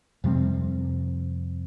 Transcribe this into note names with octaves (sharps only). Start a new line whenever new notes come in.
F2 C3 G3 C4